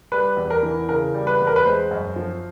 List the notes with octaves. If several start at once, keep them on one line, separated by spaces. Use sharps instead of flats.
G3 B4
E2
A#4
E3
C#3 A#4
G3
B4
E2
A#4
B4
G#3 C5
F#2
F3